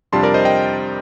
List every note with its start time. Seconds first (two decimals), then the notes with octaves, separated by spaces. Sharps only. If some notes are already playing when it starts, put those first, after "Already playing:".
0.12 F2 C3 G3 D4 F4 A5 C6
0.23 A#4 D5
0.34 C5 D#5
0.45 D#5 G5